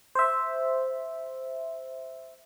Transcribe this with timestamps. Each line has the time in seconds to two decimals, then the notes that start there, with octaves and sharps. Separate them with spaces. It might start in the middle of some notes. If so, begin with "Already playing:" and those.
0.15 C5 E5